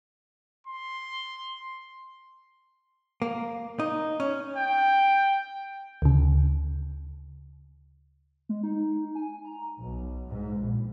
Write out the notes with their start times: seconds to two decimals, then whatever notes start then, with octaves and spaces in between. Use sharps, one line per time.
0.67 C6
3.22 A#3
3.79 D#4
4.20 C#4
4.56 G5
6.02 D2 C#3
8.49 G#3
8.63 D#4
9.15 G#5
9.45 A#5
9.83 B1
10.28 G#2
10.61 A#1